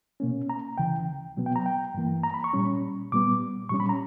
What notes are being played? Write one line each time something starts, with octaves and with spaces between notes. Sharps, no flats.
B2 A#3 C#4
A#5
D2 C#3 E3 G5
B2 F#3 B3
G5
A#5
G5
G2 E3 A#3
A#5
B5
C#6
A#2 G3 C#4
A#2 G3 B3 D6
A#2 G3 C#4 C#6
B5
A#5